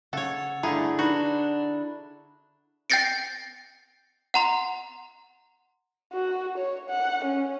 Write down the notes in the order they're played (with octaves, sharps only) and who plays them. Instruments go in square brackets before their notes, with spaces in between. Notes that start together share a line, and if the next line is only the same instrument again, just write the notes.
[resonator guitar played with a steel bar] C#3 [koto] A4 C#5 [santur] F#5
[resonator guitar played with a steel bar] G2 A3 A#5 [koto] D3 G#4 [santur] E4
[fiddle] D4 [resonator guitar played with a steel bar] D#4 [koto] F#4 [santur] B4
[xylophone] G5 G6 A6 A#6 C#7 D7
F#5 A#5 C6
[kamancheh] F#4
C#5
F#5
C#4